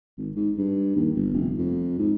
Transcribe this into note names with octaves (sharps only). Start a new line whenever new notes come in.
G#1
G#2
G2
D#2
G1
F1
F2
G#2